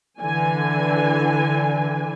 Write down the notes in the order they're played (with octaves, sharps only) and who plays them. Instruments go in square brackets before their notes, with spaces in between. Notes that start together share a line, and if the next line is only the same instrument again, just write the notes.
[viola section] D3 E3 G#5